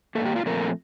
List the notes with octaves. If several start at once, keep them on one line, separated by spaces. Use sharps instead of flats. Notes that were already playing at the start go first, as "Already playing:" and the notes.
G2 D#3 A#3 A4
G4
F4
A#2 F3 A3 C4 A#4